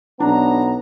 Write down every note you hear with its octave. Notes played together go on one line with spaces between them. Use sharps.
B1 B3 D4 A#5